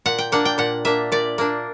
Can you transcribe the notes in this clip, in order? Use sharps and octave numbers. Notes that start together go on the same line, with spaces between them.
A#2 F#5
G5
A#3 D4 F#5
G5
A#2 F#5
A#3 D4 E5
A#2 D5
A#3 D4